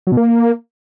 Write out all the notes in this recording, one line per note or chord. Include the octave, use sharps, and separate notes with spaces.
F#3
B2
A#3